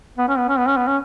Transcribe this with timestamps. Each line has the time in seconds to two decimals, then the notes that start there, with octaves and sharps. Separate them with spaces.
0.18 B3
0.28 C#4
0.38 B3
0.48 C#4
0.58 B3
0.68 C#4
0.77 B3
0.87 C#4